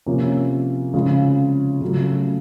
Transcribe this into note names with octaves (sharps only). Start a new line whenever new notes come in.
C3 F3 A#3 C#4
C#3 F3 G#3 C4 F4
C#3 F#3 A3